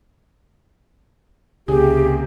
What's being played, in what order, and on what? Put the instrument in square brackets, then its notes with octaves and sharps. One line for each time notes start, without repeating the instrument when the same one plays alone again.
[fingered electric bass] C#2 C#4 [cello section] C3 A#3 [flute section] G4 [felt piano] G#4